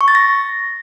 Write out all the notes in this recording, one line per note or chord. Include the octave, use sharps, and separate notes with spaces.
C#6
A6
A#6